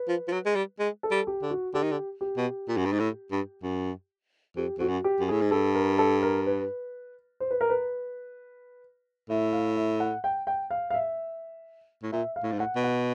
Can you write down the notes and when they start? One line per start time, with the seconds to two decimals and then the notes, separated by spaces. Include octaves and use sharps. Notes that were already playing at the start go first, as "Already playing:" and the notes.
Already playing: B4
0.08 F3
0.28 F3
0.32 F#3
0.46 G#3
0.56 G3
0.80 G#3
1.03 A4
1.11 G3
1.27 G4
1.43 D3
1.50 F#4
1.74 D3 G4
1.83 D#3
1.92 D3
2.21 G4
2.37 B2
2.69 A#2
2.77 F#2
2.85 G2
2.92 G#2
3.00 A2
3.31 G2
3.63 F#2
4.57 F2 G4
4.79 F2 F#4
4.88 F#2
5.04 G4
5.20 F#2
5.29 A2 G#4
5.41 G#2
5.51 G2 A4
5.75 A#4
5.99 A4
6.22 A#4
6.46 B4
7.40 C5
7.51 B4
7.61 A#4
7.70 B4
9.29 A2 E5
9.53 F5
9.77 E5
10.00 F#5
10.24 G5
10.47 G5
10.71 F5
10.90 F5
10.94 E5
12.03 A2
12.12 A#2 E5
12.36 F5
12.44 A2
12.52 G#2
12.59 A2 F#5
12.76 B2
12.84 F#5